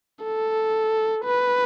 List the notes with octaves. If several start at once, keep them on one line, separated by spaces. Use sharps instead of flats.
A4
B4